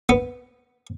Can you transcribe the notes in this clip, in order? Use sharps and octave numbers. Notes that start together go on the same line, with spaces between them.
B3